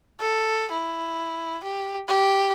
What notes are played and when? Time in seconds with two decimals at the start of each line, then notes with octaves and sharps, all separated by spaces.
0.20 A4
0.71 E4
1.64 G4
2.08 G4